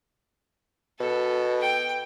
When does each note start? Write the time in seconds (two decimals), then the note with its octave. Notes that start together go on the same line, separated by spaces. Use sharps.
1.00 B2 A4
1.60 G5